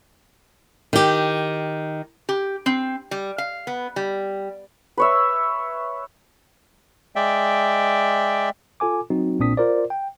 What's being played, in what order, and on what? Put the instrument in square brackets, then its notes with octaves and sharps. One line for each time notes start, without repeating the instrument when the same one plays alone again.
[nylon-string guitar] D#3 G4
[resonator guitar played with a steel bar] G4
C4
G3
F5
B3
G3
[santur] B4 C#5 E5
[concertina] G#3 D5 E5 G5
[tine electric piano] F4 A4 G#5 D6
F#3 C4 D#4 F#4
B1 A#2 C4 D4 D#6 B6
F4 A#4 C5 D5
G5